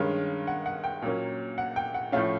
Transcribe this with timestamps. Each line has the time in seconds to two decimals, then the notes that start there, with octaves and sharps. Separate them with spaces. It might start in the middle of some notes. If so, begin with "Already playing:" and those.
Already playing: G2 D#3 G#3 C#4 F5
0.47 F#5
0.66 F#5
0.84 G5
1.02 A#2 F#3 A#3 C#4
1.58 F#5
1.76 G5
1.94 F#5
2.12 A2 F3 A3 C#4 F5